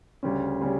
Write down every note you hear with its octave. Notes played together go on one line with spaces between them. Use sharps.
D2 C#3 G3 C#4
C#3 G3 C#4